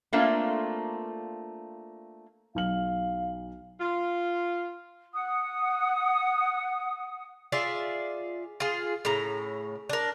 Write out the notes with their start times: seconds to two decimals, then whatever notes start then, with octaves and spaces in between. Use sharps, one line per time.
0.13 A3 A#3 C4 D4 F4
2.55 B1 F5 F6 F#7
3.79 F4
5.13 F#5 D#6
7.52 F4 G#4 D5 E5
8.60 F4 G#4
9.05 A2 C#3 A#5
9.89 D4 A#4